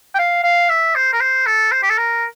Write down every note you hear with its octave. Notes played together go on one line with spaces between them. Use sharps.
G5
F5
F5
E5
C5
A#4
C5
A4
C5
G4
A4
A#4